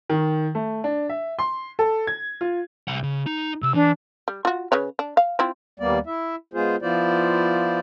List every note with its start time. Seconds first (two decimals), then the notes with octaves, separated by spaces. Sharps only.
0.10 D#3
0.55 A3
0.84 D4
1.09 E5
1.39 C6
1.79 A4
2.07 G#6
2.41 F4
2.88 C2 F#5
3.03 C#3
3.26 D#4
3.63 C3 E6
3.75 E3 D4
4.28 G3
4.45 F4 F#4
4.72 C#3 B4 C#5
4.99 D4
5.17 F5
5.39 C4 E4 F4
5.80 D#2 G3 A#3 B3 D5
6.06 E4 E5
6.54 G#3 B3 F4 G#4 C5
6.82 F3 B3 E4 F4 C5 D5